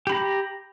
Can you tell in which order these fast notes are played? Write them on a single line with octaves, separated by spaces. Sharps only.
G4 B5 A#5